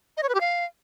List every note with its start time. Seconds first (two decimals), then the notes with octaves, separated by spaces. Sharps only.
0.17 D#5
0.23 C#5
0.29 B4
0.35 G4
0.40 F5